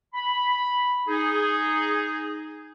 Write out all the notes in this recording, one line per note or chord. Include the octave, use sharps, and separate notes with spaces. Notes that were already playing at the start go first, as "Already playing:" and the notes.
B5
D#4 G#4